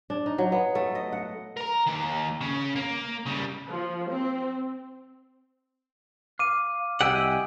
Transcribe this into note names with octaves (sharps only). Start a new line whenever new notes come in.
D4
D#4
F#3
B3
A3
D#5
F#5
A#4 A#5
D#3 A#3
C#3 C#4
A#3
C#3 G3
F3
C4
F5 D6 D#7
C2 G4 D#5 F#5 G#5 E6 D7